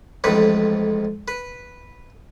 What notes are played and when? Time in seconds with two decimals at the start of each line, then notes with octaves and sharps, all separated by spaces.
0.24 A1 F2 G#2 B4
1.28 B4